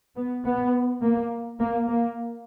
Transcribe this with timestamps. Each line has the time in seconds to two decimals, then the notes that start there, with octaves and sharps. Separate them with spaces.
0.17 B3
0.45 B3
1.02 A#3
1.59 A#3
1.88 A#3